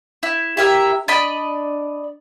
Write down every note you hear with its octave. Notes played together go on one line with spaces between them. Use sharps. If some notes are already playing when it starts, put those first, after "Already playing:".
E4
E4 G4 A#4 E5
D4 D5 D#5 B5